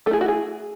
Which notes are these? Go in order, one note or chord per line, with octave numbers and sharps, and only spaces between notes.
A3 E4 G#4 A4
F#4
G#4